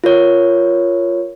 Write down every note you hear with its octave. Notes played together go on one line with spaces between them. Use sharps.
F4 A#4 C#5